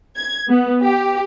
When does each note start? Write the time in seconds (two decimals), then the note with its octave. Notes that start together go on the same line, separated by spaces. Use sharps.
0.17 G#6
0.49 B3
0.84 G4